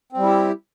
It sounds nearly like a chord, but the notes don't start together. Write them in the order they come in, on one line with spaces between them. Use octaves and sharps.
C4 G3 E4 G4